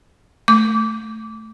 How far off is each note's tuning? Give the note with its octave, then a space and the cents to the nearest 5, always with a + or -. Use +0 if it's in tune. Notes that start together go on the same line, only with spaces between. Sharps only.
A3 +0 D6 -20